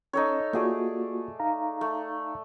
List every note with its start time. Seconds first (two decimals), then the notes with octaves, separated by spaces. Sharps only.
0.13 C#4 D#4 A4 C#5
0.53 A3 A#3 F4 F#4 G#4 D5
1.40 D#4 F5 A#5
1.81 A3